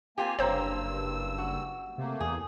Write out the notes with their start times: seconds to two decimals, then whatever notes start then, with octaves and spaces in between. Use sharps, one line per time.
0.18 A#3 C4 F4 G4 G#5
0.39 F#1 G2 C3 A#3 C4 C5 C#5 E6
1.38 F#4
1.98 C3 A3 A#3
2.20 E2 G#4